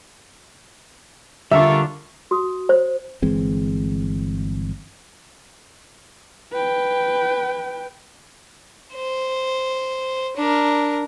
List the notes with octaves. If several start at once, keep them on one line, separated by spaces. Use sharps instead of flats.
D3 G3 D4 F4 A#4 E5 C#6
F#4 D#6
C5
G1 E3 G#3 C4
B4 G5
C5
D4 A#4